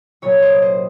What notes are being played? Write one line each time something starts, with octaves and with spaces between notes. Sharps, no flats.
C2 A#2 F#3 C#4 C#5
C5 D#5
C5 D#5